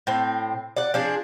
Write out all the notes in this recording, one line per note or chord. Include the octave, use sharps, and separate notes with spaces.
A2 C4
D5 F#5
F3 D4 G#4